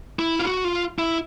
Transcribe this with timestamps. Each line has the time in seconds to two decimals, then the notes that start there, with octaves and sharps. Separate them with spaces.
0.19 E4
0.39 F4
0.47 F#4
0.64 F4
0.99 E4